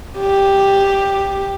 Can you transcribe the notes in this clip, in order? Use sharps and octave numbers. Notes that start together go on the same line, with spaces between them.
G4